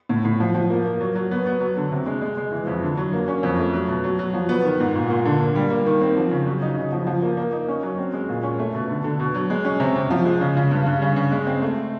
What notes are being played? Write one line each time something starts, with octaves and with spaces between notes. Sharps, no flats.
A2
A2
F3
F3
A#3
A#3
F#3
F#3
B3
B3
F#3
D3
C3
G#3
G#3
G#3
E3
F2
D3
F#3
A#3
C#4
F2
A3
F#3
B2
F#3
F#3
F3
B3
D#3
G#2
A#2
A#2
D3
A#3
G3
A#3
D#3
C4
F3
C#3
F#3
D#4
C#3
F3
F3
A#3
A#3
D#4
C#4
F#3
C4
G#3
A#2
C#4
A3
B2
D3
D3
B2
F#3
G#3
C#4
C3
C3
F3
G#3
C#3
C#3
G2
G2
C#3
C#3
G#3
C4
A3